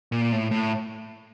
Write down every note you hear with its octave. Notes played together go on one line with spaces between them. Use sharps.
A#2
A2
A2